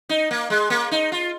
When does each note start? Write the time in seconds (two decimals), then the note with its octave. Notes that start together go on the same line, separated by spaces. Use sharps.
0.09 D#4
0.31 A#3
0.50 G#3
0.70 A#3
0.91 D#4
1.12 F4